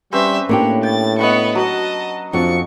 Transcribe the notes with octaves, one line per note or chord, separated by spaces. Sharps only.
G3 C4 C#4 G4 B4 E5
A2 A#3 D4 G4 C#5 B5
G5 A6
B3 D#5 F#5 B5 C#6
F#3 D#5 A5
F2 F3 D4 F#4 C#6 C#7